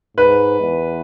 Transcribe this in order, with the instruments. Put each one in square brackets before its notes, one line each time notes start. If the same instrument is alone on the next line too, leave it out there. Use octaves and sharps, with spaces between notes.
[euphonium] G#2 [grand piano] B4
[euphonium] E2